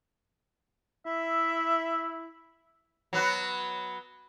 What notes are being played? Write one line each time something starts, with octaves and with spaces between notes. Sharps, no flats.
E4 E5
F#3 B3 F#4